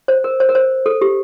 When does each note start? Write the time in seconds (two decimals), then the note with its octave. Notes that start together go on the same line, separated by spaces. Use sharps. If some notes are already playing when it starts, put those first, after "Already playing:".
0.08 C5
0.24 A#4
0.40 C5
0.49 A#4
0.55 C5
0.86 A4
1.01 G4